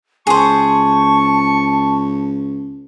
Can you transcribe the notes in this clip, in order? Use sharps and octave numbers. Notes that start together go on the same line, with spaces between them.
C#2 G#4 C5 A5 C#6